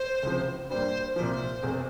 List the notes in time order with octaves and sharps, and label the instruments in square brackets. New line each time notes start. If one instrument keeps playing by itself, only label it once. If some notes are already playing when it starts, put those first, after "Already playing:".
Already playing: [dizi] C5
[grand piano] C#2 C3 F3
[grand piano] G2 G3 A#3 [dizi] C5
[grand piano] C2 A#2 F3 [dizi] C5
[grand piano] E1 E2 C3